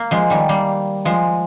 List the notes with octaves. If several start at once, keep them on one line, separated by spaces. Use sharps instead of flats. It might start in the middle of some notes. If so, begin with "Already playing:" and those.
Already playing: A#3
F3 G#3
D#3 G3
G3 A#3
F3 G#3